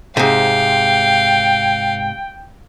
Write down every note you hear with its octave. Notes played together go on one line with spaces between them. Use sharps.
G#2 C3 F5 G5